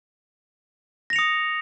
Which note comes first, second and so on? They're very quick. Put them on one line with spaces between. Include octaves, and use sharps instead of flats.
A#6 F7 C#7 D#6